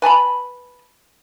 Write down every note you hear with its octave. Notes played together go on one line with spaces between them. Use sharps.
B4 G#5 A5 B5